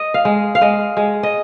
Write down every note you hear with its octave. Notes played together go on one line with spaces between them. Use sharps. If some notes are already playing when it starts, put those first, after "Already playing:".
Already playing: D#5
F5
G#3
F5
G#3 D#5
G#3
D#5